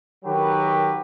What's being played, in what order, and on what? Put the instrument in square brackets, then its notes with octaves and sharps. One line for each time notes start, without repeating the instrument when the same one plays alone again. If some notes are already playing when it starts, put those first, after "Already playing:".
[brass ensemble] D#3 F#3 G4 A#4 B4